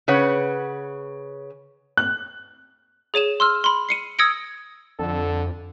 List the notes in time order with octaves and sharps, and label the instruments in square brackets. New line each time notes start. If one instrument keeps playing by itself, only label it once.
[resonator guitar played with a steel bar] C#3 B4 C#5 F#5
[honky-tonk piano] F#6
[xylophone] G#4 C#5 D#7 E7
C6 E6 F6
B5 C6
C7 C#7 D#7
D#6 E6 G#6 A#6 C#7 D7
[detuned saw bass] F2 [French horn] D3 [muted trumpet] A4